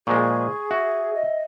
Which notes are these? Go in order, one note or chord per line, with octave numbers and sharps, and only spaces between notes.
A#2 F3 G#3 G#4 C#6
F#4 E5
D#5